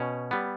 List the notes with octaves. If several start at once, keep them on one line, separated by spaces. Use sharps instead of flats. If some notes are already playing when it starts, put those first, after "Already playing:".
Already playing: B2 C#4
G3 B3